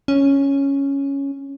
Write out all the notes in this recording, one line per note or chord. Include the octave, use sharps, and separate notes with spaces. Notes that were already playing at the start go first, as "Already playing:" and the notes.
C#4